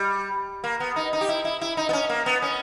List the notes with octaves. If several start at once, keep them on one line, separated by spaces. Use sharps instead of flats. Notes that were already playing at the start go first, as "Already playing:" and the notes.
Already playing: G3
A#3
B3
D#4
D#4
G4
E4
E4
E4
D#4
B3
C#4
A#3
B3
C#4